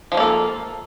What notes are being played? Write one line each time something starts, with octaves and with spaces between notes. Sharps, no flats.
F3 G3 A#3 F4 A4